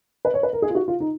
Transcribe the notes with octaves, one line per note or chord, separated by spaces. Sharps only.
B4
C#5
B4
A#4
G#4
F4
F#4
F4
D#4